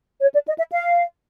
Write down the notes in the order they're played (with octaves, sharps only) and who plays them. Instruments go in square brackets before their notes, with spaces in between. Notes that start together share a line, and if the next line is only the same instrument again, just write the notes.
[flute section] C#5
D5
D#5
E5
F5